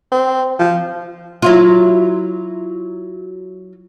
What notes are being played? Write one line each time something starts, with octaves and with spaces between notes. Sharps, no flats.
C4
F3
F#3 E4 F4